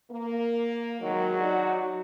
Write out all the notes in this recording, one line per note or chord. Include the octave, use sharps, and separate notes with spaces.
A#3
D#3 F#3 G#3
D#4 F#4 D5